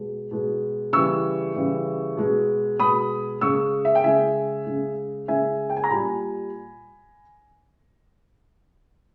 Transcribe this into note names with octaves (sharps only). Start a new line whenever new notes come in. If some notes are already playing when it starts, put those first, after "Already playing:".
Already playing: B2 G#3
B2 G#3
C#3 E3 G3 C#6 E6
C#3 E3 G3
B2 G#3
B2 G#3 B5 D#6
C#3 G#3 C#6 E6
E5
G5
C#3 G#3 E5 G#5
C#3 G#3
C#3 G#3 E5 G#5
G5
G#5
A#5
A#2 G3 G#5 B5